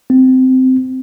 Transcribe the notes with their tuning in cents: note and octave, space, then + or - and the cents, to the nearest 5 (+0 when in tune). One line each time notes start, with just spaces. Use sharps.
C4 -15